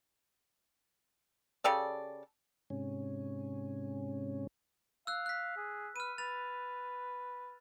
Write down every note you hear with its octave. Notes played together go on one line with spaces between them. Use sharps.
C#3 G4 A4 D5
G#2 C3 C#4
F5 E6 F#6
F#6 B6
G#4
B4 F6 D#7
B4 A6 F7